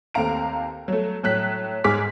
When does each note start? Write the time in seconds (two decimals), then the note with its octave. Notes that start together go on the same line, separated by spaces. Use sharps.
0.14 D#2 A3 C4 F5 A#5 D7
0.88 F#3 A3
1.23 A2 F#3 F#6 B6
1.84 G#2 G#4 D6 F6 B6